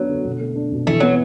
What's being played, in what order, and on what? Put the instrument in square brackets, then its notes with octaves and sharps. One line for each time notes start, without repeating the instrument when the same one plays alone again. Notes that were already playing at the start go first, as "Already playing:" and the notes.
Already playing: [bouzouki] F#3 [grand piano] B3 D4 F#4
[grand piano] D3
B2
A3
D4
B2
[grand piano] E3 [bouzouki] A3
[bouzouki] F#3 [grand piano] B3